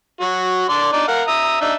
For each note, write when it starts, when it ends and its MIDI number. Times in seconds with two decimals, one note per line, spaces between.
0.21 0.64 54
0.21 0.64 66
0.69 0.89 62
0.69 0.89 74
0.69 0.89 84
0.93 1.04 62
0.93 1.04 63
0.93 1.04 74
1.08 1.22 70
1.08 1.22 77
1.08 1.22 78
1.28 1.61 76
1.28 1.61 82
1.28 1.61 87
1.61 1.74 62
1.61 1.74 63
1.61 1.74 76